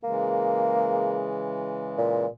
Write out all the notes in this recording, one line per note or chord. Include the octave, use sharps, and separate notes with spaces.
C#3 E3 G#3 A#3
A#2